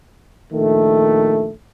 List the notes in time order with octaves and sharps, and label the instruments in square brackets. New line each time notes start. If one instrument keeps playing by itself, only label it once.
[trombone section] A#1 D#3 A3